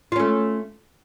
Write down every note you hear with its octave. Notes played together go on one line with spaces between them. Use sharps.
A3 C#4 F4